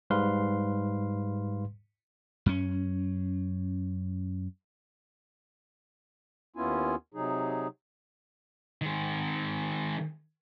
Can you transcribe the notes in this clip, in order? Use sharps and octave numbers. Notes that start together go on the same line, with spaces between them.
G#2 G3 B4 F5 C6
F#2 C#4
D#2 B3 C#4 E4 F4 G#5
C3 F#3 D#4 G#4
D#3 G#3